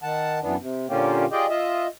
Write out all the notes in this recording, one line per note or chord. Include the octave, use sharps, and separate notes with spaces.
D#3 F#5 A5
F#2 E3 B3 D4
C3
A#2 D3 A#3 C#4 F4 G4
F4 G4 G#4 D5 D#5 G5
F4 D#5 E5